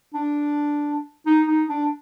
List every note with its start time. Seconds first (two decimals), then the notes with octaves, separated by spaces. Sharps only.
0.14 D4
1.26 D#4
1.47 D#4
1.69 D4